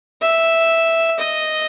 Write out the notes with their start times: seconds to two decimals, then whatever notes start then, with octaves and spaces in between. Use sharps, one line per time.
0.21 E5
1.19 D#5